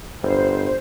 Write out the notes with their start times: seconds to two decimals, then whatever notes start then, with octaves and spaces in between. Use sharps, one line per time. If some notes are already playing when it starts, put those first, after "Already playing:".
0.23 G1 C5